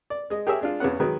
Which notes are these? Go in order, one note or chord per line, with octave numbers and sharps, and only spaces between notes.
D5
G#3 D#5
G4 G#4 A#4 C#5 E5
G#3 D4 F4
E2 C#3 B3 C#4 F#5
D#3 F#3 G#3 B4